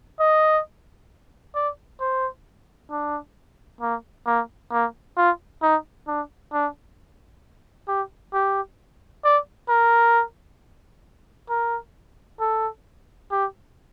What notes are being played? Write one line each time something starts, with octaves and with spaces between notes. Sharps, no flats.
D#5
D5
C5
D4
A#3
A#3
A#3
F4
D#4
D4
D4
G4
G4
D5
A#4
A#4
A4
G4